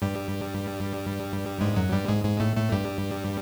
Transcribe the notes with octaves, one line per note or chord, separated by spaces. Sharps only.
G2 G3
G#2 G#3
F#2 F#3
G2 G3
G#2 G#3
G#2 G#3
A2 A3
A2 A3
G2 G3